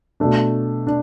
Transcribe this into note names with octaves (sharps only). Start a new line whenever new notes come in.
B2 A3 D4
D4